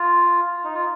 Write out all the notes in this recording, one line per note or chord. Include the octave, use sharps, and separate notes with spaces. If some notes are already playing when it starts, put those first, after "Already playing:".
Already playing: F4
D#4
F4